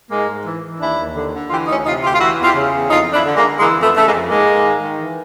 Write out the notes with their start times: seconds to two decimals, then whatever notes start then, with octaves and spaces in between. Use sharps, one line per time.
0.11 G#2 G#3 A#3
0.28 G#2
0.45 E3
0.64 E3
0.80 D#2 D4 E4
0.99 D#2
1.15 D3
1.33 D3
1.50 E3 F4 G4
1.68 D2 C#4 D#4
1.85 C3 D#4 F4
2.02 D2 F4 G4
2.13 F4
2.20 E3 E4 F#4
2.38 E2
2.44 F4 G4
2.55 C#3
2.72 E2
2.90 F2 D#4 F4
3.07 F2
3.13 D4 E4
3.25 D3
3.36 G#3 A#3
3.42 D3
3.59 E3 G#3 A#3
3.77 F2
3.82 A3 B3
3.95 C#3 A3
4.06 G#3 A#3
4.12 F2
4.29 G#2 G#3 A#3
4.47 G#2
4.64 D#3
4.82 D#3
4.99 E3